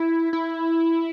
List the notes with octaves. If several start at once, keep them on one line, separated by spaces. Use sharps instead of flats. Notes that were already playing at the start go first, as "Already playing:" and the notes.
Already playing: E4
E4